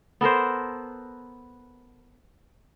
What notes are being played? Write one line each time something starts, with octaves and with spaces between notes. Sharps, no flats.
B3 A4 A#4 C5